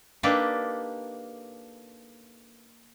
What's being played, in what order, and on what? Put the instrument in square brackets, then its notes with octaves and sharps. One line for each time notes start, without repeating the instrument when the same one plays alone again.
[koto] A#3 D4 D#4 G4 A4 B4